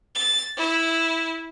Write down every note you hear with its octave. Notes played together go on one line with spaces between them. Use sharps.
A6
E4